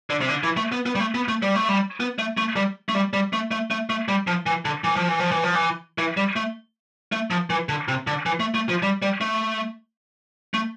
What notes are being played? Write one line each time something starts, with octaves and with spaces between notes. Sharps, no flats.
D3
C3
D3
E3
A3
B3
B3
G3
A3
B3
A3
G3
A3
G3
B3
A3
A3
G3
A3
G3
G3
A3
A3
A3
A3
G3
F3
E3
D3
E3
F3
E3
F3
E3
F3
E3
E3
G3
A3
A3
F3
E3
D3
C3
D3
E3
A3
A3
F3
G3
G3
A3
A3